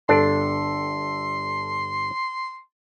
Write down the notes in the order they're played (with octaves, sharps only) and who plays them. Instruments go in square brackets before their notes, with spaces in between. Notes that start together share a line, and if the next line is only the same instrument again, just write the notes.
[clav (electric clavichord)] G1 D4 [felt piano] A4 [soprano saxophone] C6